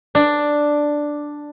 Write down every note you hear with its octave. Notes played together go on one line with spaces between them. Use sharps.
D4